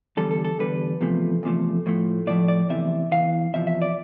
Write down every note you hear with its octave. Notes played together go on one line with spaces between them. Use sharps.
E2 D3 G3 A4
A4
A4
E2 D3 G3 B4
E2 C3 F3 A3
E2 C3 F3 A3
A2 F3 A3
A2 F3 A3 D5
D5
E2 C3 E3 E5
E2 C3 E3 F5
E2 C3 F3 E5
E5
D5